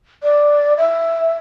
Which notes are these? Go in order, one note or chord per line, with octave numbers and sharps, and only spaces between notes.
D5
E5